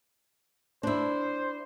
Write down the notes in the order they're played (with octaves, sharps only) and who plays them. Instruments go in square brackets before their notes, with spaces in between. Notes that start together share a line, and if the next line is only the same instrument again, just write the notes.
[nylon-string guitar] D4 E4 [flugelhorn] C5